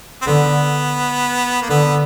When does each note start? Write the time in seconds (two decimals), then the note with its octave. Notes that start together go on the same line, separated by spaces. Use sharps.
0.22 C4
0.27 D3 B3
1.62 A#3
1.70 D3 B3